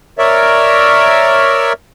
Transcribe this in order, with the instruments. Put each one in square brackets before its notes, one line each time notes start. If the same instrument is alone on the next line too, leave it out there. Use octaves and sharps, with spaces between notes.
[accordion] A#4 C#5 D5 E5